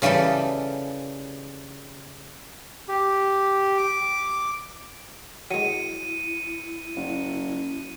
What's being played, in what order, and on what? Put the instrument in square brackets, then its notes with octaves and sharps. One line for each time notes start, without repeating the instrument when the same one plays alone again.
[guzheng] C#3 E3 G3 G4 A4
[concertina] G4
D6
[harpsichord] F#3 G#3 [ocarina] E4 [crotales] C#7 D#7
[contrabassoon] F#1